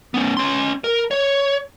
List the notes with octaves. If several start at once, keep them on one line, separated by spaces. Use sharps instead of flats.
B3 C#4
C#4 C6
A#4
C#5